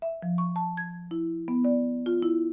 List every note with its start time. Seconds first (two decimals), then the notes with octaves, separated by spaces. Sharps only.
0.02 E5
0.22 F3
0.38 C#6
0.56 A5
0.77 G#6
1.11 E4
1.48 B3
1.65 D5
2.06 F4
2.23 E4